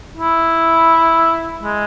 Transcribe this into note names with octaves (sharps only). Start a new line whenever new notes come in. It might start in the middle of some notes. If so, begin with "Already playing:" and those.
E4
G#3